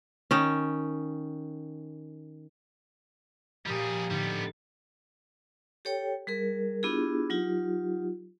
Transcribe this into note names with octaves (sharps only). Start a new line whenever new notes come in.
D#3 C#4
A#2 F3 G3 G4 G#4 A#4
A2 D3 G3 B3 D#4
G4 A4 C#5 G5
G3 G#4 A#4
B3 D4 E4 F4 G4 G#4
F#3 D#4 F4 G4